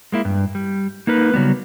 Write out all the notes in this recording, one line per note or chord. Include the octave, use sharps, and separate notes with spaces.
G#3 A#3 E4
G2
G3
A#3 D#4 A#4 B4
C#3 F#3 G3 B3